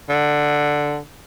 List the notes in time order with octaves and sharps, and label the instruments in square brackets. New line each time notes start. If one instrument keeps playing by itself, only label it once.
[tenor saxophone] D3